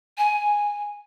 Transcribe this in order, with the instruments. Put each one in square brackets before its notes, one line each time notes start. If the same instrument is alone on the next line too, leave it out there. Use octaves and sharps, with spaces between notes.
[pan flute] G#5